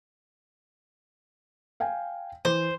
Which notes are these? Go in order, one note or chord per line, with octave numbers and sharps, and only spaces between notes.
F5 G5 G#5
E3 C5